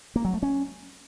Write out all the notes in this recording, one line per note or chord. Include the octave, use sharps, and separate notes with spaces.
A#3
F#3
A3
C#4